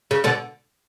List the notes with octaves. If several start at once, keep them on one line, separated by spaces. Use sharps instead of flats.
C#3
B2 D3